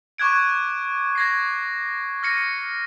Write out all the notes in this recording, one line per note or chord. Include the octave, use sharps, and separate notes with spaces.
C#6 D6 F#6 G#6 D7
G#6 A#6 C7
F6 A#6 C#7 D#7